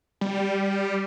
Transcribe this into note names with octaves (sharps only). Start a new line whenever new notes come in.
G3